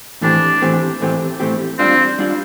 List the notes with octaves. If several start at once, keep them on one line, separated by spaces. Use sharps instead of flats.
A2 E3 A3 C4 D4 G4
A2 E3 A3 C4 G4
A2 E3 A3 C4 G4
A2 E3 A3 C4 G4
G3 C4 D4 F4
G3 D4 F4